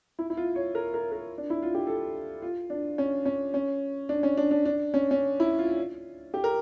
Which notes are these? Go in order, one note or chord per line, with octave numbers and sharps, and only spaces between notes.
E4
E4
F4
C#5
A#4
A#4
A#4
D4
E4
F4
G4
A4
F4
D4
C#4
C#4
C#4
D4
C#4
D4
D4
D4
C#4
C#4
E4
F4
G4
A#4